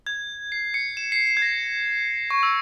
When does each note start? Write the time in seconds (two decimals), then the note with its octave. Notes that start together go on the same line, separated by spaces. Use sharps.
0.07 G#6
0.52 C7
0.74 C#7
0.97 E7
1.12 C7
1.27 C7
1.37 G#6
1.42 A#6
2.30 C#6
2.43 E6